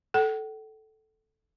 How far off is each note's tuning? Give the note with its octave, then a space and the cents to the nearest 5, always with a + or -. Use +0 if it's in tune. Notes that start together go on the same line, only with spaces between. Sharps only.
A4 -10 F#5 +45